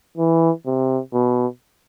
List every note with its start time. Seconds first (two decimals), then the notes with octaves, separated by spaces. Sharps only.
0.17 E3
0.66 C3
1.13 B2